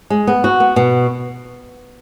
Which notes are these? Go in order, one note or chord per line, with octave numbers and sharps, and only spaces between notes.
G#3
B3
F#4
B3
B2